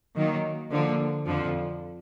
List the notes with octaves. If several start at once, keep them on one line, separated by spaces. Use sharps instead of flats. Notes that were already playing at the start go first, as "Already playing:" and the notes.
D#3 F#3 A#3
D3 F3 A#3
F2 D3 F3